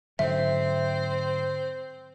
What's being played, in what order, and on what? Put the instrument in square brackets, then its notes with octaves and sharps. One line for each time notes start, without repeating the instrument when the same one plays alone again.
[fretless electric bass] G#2 D3 F#3 [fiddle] C4 C5 [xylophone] E5